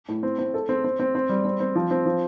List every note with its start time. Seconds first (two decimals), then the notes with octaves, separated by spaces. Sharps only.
0.09 A2
0.23 C4
0.38 C4
0.54 A4
0.69 C4
0.84 C4
0.99 C4
1.15 C4
1.29 G3
1.45 C4
1.60 C4
1.75 F3
1.91 C4
2.06 F3